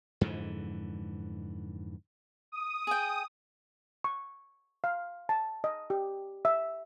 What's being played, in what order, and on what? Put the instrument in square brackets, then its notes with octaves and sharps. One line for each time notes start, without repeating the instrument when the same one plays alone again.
[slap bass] F2 G#2 D3 E3
[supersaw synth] D#6
[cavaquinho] G#4 G5
[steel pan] C#6
F5
A5
D#5
G4
E5